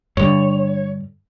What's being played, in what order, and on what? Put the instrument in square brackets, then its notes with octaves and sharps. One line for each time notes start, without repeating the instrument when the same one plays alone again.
[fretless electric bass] G2 D3 [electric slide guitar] C#5